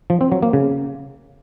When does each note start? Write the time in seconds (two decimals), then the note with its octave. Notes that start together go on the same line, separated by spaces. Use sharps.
0.10 F3
0.21 C4
0.32 F#3
0.43 A#3
0.53 C#3